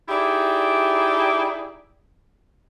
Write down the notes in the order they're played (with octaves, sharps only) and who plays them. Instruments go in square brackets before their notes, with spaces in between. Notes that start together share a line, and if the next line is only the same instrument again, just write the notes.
[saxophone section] D#4 E4 G4 G#4 D5 E5